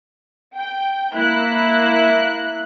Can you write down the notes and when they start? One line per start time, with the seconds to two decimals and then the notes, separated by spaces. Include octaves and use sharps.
0.55 G5
1.14 A#3 E4 F#6